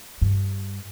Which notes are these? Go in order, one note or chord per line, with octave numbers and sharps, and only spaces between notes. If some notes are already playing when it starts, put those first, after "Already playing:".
G2